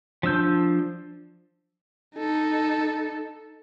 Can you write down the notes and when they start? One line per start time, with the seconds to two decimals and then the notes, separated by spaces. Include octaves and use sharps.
0.23 F3 D4 E6 G6
2.16 D#4 A4